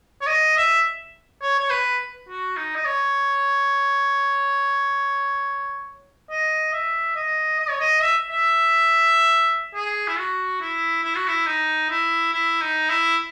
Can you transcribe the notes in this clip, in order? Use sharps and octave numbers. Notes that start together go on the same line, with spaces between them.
C#5
D#5
E5
C#5
C#5
B4
F#4
D#4
D#5
C#5
D#5
E5
D#5
D#5
C#5
D#5
E5
E5
G#4
E4
F#4
E4
E4
F#4
E4
D#4
E4
E4
D#4
E4